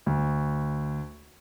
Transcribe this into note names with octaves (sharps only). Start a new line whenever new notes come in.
D2